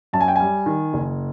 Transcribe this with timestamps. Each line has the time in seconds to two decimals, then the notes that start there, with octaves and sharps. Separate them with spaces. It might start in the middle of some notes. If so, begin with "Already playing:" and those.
0.13 F#2 A5
0.21 G#5
0.28 G5
0.36 G3 G#5
0.66 D#3
0.93 F#1